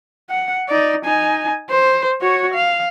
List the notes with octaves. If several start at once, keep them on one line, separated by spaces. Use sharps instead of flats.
F#5
D#4 D5
D#4 G#5
C5
F#4 C#5
F5